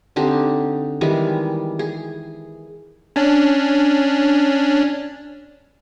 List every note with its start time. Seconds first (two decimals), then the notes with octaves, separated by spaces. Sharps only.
0.16 D3 C4 D#4 G4
1.01 D#3 E3 G3 G#3
1.79 G#4
3.16 C#4 D4